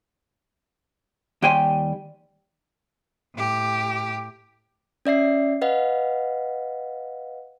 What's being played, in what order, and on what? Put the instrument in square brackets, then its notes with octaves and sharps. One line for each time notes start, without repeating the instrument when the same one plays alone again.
[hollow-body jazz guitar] D#2 G3 G5 G#5 C6
[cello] A2 G4
[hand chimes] C#4 D5 E5 C7
B4 D#5 F5 F#5